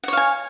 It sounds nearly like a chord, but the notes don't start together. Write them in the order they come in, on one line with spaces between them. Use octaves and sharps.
F#5 C#5 F5 G#5